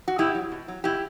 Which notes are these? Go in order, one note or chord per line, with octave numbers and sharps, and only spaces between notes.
F#4
B2 E4 G4
F#3
B2
F#3
B2 E4 G4